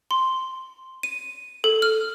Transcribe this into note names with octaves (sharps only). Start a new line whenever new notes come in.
C6
D#7
A4
F6